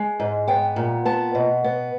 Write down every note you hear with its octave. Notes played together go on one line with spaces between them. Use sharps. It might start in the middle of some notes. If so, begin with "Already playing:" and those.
Already playing: G#3
G#2
B3 G5
A#2
B3 A5
B2
B3